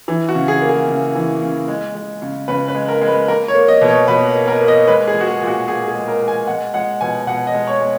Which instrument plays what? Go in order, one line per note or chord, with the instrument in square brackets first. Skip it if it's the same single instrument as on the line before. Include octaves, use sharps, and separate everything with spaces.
[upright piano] E3
F#4
C#3
G#4
A#3
G#4
C#3
E3
C#3
G#3
G#3
C#3
C#3 B4
B4
G#3
A#4
G#3
B4
A#3 A#4
C#5
A#3
D#5
B2
C#5
B2 B4
A#3
A#4
A#3
D#5
G#3 B4
G#4
G#3
F#4
G#4
A#2
F#4
A#2 G#4
G#4
G#3
A#4
G#3
G#5
G#3 F#5
G#3 F#5
B2 G#5
B2 F#5
D#5
G#3
C#5
G#3